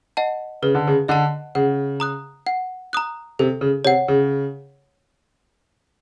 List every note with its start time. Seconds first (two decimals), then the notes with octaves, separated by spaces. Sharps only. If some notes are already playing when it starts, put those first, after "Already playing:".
0.17 D#5 F#5 A5
0.62 C#3 B4
0.75 D3
0.87 C#3
1.08 D3 D#5 F#5 A5
1.55 C#3 F#5
2.00 A#5 D#6 F#6
2.47 F#5
2.93 A#5 D#6 F#6
3.39 C3 A4
3.61 C#3
3.85 C3 C#5 F#5
4.08 C#3